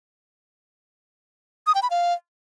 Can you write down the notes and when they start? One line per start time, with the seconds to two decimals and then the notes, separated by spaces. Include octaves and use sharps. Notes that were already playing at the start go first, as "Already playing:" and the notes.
1.67 D#6
1.75 G5
1.83 B5
1.90 F5